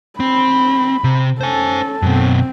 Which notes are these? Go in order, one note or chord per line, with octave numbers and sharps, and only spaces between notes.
C4 B5
C3
C#4 A4 C5 G#5
F#2 B2 C4